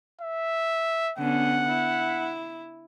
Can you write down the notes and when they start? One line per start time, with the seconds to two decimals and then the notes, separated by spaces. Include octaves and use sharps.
0.21 E5
1.18 D3 B3 C#4 F#5
1.69 E4